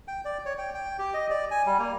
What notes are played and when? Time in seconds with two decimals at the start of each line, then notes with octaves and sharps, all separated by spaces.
0.08 G5
0.25 D5
0.46 C#5
0.58 G5
0.74 G5
0.99 G4
1.14 D#5
1.30 D5
1.51 G#5
1.66 G3
1.79 A#3